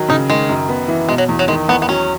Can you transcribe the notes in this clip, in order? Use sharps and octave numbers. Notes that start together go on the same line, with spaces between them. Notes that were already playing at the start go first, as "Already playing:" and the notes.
Already playing: D#3 F#3
C#3 D#4
D#3 G#3
F#2
B3
E3
B2 G#3
F#3
E2
F#3
D#3 G#3
E2 B3
B3
F#3 C#4